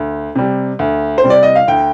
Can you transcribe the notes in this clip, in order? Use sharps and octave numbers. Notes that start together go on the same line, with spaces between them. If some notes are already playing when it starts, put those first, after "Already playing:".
Already playing: D2
C3 G3
D2
C5
C3 G3
D5
D#5
F5
D2 G5